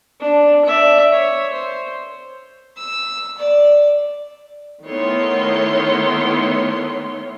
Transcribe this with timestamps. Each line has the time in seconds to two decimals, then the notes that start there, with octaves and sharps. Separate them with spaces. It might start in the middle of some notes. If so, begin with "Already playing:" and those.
0.20 D4
0.65 D5 E5
1.12 C#5
1.53 C5
2.77 E6
3.38 D5
4.84 D#3 A3 B3 E4 C#5 C6